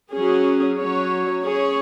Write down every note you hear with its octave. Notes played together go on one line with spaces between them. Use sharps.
F#3 C#4 G#4
F#3 C#4 F#4 C#5
C#4 G#4 C#5